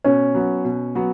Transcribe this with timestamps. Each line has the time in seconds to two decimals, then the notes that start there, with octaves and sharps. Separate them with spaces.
0.04 B2 C#4
0.34 F#3 B3 F#4
0.65 B2
0.95 F#3 B3 F#4